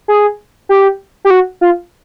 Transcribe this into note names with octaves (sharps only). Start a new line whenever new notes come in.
G#4
G4
G4
F#4
F4